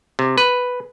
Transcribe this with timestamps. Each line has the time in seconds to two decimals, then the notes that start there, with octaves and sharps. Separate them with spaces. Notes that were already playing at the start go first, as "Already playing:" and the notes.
0.19 C3
0.38 B4